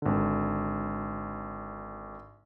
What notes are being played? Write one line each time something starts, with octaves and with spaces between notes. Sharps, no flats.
G#1 D3